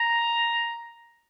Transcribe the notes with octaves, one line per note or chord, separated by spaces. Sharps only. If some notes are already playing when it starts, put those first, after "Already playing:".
Already playing: A#5